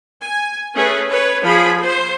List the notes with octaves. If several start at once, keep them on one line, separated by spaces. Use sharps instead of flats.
G#5
A3 C#4 G#4 B4
B4 C#5
F3 G#4 B5
C5